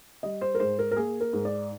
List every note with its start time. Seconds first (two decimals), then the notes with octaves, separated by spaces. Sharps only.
0.23 G3 D#5
0.41 C5
0.55 A#4
0.60 G#2 C5
0.79 A#4
0.91 A#4
0.96 A#3 G#4
1.21 A#4
1.33 G#2
1.45 D5